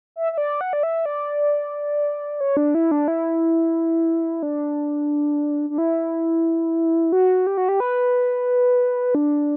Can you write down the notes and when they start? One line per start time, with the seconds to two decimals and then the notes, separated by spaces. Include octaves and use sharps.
0.16 E5
0.32 E5
0.38 D5
0.61 F#5
0.73 D5
0.83 E5
1.06 D5
2.41 C#5
2.57 D4
2.75 E4
2.91 D4
3.08 E4
4.43 D4
5.70 D4
5.78 E4
7.12 F#4
7.47 G4
7.57 F#4
7.69 G4
7.80 B4
9.15 D4